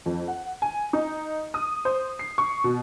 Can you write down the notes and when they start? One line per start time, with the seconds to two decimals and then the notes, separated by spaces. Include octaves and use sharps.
0.06 F2
0.28 F#5
0.62 G#5
0.93 D#4
1.54 D#6
1.85 C5
2.19 C7
2.38 C#6
2.64 B2